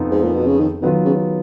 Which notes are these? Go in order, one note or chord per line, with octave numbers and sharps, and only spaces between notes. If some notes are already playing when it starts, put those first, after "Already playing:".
Already playing: F2 F3 B3 D#4
G#2
A#2
B2
C#3
D#3
B2 D#3 F#3 B3 F4 B4
C#3